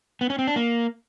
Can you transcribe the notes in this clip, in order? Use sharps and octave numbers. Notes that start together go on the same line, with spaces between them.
B3
C#4
C4
D4
A#3